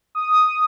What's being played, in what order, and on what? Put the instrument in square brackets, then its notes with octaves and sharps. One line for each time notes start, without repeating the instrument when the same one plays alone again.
[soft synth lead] D#6